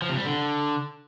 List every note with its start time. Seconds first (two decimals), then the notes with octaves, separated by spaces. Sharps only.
0.02 F3
0.10 C3
0.17 G3
0.25 D3